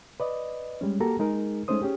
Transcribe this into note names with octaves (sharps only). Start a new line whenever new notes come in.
B4 D5 D#5
G3 G#3 C#4
A#3 F#4 G4 A4 A#4 A#5
G#3 D#4 G#4 A#4
G#3 A3 C#4 D#4 C5 D#6
C#4 G4 G#4